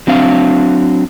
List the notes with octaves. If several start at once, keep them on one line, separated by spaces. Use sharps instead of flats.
F#3 C4 D4 F5